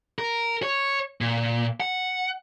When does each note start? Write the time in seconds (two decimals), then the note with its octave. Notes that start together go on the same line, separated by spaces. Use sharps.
0.18 A#4
0.63 C#5
1.21 A#2
1.80 F#5